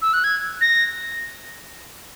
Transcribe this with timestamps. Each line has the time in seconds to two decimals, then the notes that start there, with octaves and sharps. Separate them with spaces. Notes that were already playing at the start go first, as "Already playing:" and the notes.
0.02 E6
0.13 F#6
0.24 G#6
0.61 A#6